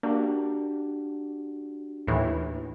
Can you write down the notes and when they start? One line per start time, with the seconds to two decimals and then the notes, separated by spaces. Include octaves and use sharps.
0.03 A#3 D4 F#4 G4
2.07 D#2 A2 E3